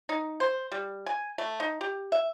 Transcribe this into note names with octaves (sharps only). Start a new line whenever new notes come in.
D#4
C5
G3
G#5
A3
D#4
G4
E5